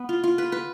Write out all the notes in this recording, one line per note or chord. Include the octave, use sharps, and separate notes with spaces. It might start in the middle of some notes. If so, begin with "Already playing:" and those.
Already playing: B3
F4
F4
B4
B4